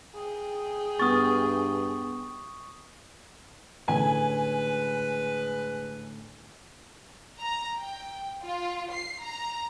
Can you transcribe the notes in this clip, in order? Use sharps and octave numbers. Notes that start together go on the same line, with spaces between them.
G#4 G5
G2 B3 C#6 D#6 A6
A2 D3 G#3 C#4 B4 G#5
A#5
G5
F4
C7
A#5